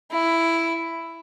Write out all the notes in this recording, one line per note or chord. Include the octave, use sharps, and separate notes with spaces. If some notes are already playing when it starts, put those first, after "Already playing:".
E4